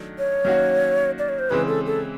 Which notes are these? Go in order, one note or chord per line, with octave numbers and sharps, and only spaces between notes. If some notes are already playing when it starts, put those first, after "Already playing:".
Already playing: D#3 F#3 A3 D4
C#5
D#3 F#3 A#3 C#4 F#4
D5
C#5
C5
C#3 E3 G#3 C4 B4
A4
A4